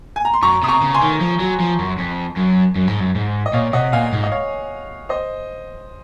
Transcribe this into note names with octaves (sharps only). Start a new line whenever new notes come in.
G#5
A#5
C6
F#2 A#5 C#6
C3 D#6
A#5 C#6
C#3
G#5 C6
D#3
F3
F#3
F3
F#2
F2
F#2
F#2
G#2
F#2
G#2
D#5
A#2 C#5 F5
C3 D#5 F#5
A#2 F5 G#5
G#2
D#5
C#5 F5
C5 D#5